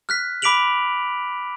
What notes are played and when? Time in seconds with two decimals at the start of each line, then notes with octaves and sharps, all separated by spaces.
0.09 F6 F#6 B6
0.42 B5 D6 B6 D7 F7 F#7